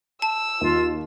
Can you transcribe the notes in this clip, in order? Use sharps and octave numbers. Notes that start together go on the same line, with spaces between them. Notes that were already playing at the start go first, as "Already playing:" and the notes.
A5 E6
D#2 F4